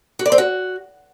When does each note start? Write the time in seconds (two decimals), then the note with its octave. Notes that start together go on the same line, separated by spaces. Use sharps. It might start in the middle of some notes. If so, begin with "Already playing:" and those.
0.19 F#4
0.26 D5
0.32 C4
0.38 F#4